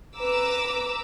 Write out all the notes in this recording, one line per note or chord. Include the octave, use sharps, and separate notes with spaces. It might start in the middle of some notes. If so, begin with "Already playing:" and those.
B4 A#5 D6 E6